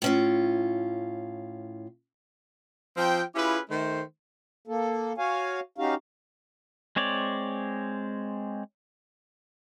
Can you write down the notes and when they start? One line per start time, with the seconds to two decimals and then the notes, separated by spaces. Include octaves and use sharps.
0.02 A2 C#4 F4
2.97 F3 C4 G5
3.35 C#4 E4 F4 G4 G#4 B4
3.70 D#3 A3 C5
4.68 A#3 A4
5.18 F#4 C#5 F5 G#5
5.78 C#4 D#4 F#4 G4 F5
6.96 G#3 C4 C#5 D5